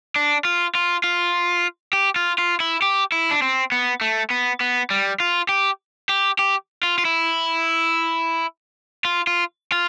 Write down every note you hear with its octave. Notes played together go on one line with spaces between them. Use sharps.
D4
F4
F4
F4
G4
F4
F4
E4
G4
E4
D4
C4
B3
A3
B3
B3
G3
F4
G4
G4
G4
F4
F4
E4
F4
F4
F4